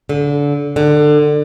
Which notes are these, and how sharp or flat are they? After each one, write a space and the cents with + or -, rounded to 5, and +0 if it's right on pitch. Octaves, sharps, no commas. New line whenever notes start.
D3 -25
D3 +25